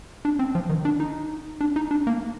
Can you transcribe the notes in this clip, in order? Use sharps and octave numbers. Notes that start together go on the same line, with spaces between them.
D4
C4
F3
D#3
D4
D#4
D4
D#4
D4
A#3